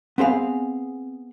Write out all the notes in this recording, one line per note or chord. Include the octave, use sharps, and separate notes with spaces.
B3 C4 G#4 F5